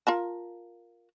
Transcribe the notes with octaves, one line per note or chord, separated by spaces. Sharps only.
F4 A#4 A5